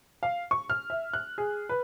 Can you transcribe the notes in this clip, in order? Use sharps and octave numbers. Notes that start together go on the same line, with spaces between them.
F5
C#6
F6
E5
F#6
G#4
B4